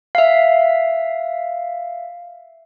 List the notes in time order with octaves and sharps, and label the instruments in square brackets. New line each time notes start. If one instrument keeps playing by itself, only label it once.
[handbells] E5 F5